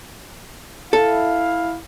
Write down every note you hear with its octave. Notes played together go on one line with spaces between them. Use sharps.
E4 A4 F5